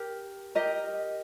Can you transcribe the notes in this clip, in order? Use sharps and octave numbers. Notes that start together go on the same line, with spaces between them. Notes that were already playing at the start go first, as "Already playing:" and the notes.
Already playing: G4 A#4
G4 A#4 D#5